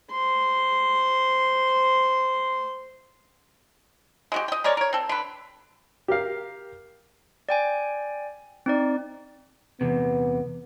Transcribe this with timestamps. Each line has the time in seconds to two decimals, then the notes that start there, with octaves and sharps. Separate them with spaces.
0.11 C5 C6
4.32 G#3 F#4 G4
4.48 D#5 G5
4.64 G#3 A#4 C#5 D5
4.77 A#4 C#5
4.93 C4 A4
5.09 D3 B4
6.08 G4 A#4 F5
7.49 D5 G5 G#5
8.66 C4 D#4 D5
9.81 E2 C3 B3